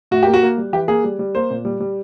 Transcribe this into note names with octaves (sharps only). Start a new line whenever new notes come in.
A2 F#4
A#3 G4
F#4
A#3
G3
E3 G4
A#3 G#4
G3
G3
A#3 C5
A#2
G3
G3